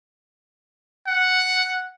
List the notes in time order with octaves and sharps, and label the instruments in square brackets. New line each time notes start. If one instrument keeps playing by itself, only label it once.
[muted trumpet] F#5